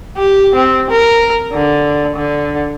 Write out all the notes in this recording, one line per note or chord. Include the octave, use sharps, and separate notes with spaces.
G4
C4
A#4
D3
D3